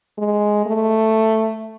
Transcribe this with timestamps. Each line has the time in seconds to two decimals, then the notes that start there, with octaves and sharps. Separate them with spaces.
0.18 G#3
0.66 A3